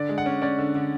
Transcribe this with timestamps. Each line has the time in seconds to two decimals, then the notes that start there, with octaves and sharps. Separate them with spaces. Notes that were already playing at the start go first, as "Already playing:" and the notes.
Already playing: D3 D5
0.09 G#3
0.18 F#5
0.26 C#4
0.42 C#4 D5
0.58 D3
0.75 D3